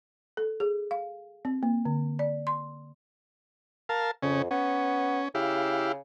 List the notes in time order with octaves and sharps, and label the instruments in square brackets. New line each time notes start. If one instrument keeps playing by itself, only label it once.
[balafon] A4
G#4
F5
C4
A#3
D3
D5
C6
[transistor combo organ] A#4 F5 A5
[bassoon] F2 [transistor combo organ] C#3 C#4
[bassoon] B3 [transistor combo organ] C#4
[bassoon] C#3 [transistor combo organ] E4 G4 F5